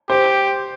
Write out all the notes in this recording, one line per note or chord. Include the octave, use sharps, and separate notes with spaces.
G4 C5